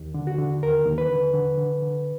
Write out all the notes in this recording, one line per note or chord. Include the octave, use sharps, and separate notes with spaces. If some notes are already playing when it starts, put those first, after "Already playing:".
Already playing: D#2
D3
F#4
D3
D#2 A#4
D#2
B4
D3
D3
D3
D3